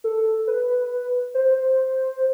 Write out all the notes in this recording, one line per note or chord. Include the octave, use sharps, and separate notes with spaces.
A4
B4
C5